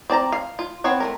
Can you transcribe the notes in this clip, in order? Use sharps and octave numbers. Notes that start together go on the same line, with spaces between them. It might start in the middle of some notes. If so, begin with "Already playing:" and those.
C4 D5 A5 A#5
F5
F4
B3 C4 C#5 F#5
A3 A#3 A#4